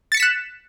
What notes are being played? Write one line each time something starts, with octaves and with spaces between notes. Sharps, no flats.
F#6 A6 B6 C#7 E7